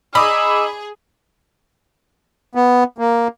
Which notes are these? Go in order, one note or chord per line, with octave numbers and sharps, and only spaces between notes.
D#4 G#4 B5 D6 E6
B3
A#3